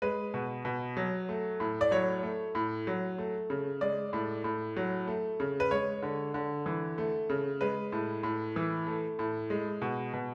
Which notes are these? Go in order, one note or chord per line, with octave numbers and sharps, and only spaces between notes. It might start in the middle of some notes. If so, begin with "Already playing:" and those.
G#3 B4
B2
B2
F#3
A3
A2
D5
F#3 C#5
A3
A2
F#3
A3
C#3
G#3 D5
A2
A2
F#3
A3
C#3
B4
G#3 C#5
D3
D3
E3
A3
C#3
G#3 B4
A2
A2
E3
A3
A2
G#3
B2
B2